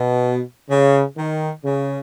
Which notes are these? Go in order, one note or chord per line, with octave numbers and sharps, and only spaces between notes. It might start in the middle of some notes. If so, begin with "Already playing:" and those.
Already playing: B2
C#3
D#3
C#3